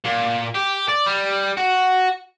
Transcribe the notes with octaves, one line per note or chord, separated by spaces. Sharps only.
A#2
G4
D5
G3
F#4